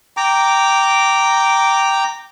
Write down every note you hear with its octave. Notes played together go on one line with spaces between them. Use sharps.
G5 A#5 D6